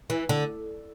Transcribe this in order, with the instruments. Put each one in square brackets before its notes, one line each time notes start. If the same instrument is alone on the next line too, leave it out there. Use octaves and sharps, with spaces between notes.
[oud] E3
D3